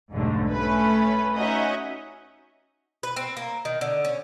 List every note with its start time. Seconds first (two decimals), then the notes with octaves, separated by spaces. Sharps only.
0.12 B1 F2 G#2 D3 G3 A3
0.52 A3 C#4 B4
1.36 C#4 D#4 F#4 D#5 E5 F#5
3.03 B4
3.16 C4
3.37 A#3
3.65 D#3
3.81 D3
4.05 C#4